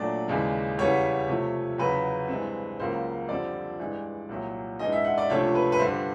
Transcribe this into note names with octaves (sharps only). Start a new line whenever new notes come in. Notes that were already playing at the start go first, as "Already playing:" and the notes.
Already playing: A#2 F#3 A3 D4 D5
D#2 C#3 E3 G#3
E2 C#3 E3 G3 B3 C#5
C3 F3 A3
E2 C#3 F#3 B4
G2 E3 G#3 C4
C#2 C#3 F#3 A#3 C5
F2 D3 G3 C4 D5
G2 E3 G#3
C2 A#2 F#3
G#2 E3 G#3 B3 D4 D#5
E5
F#5
D5
C#2 C3 F3 A3 D4 C#5
B4
B4
G2 D3 G3 C5